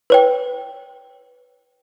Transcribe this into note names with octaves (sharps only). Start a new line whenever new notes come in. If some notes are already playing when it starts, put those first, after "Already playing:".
B4 C#5 G5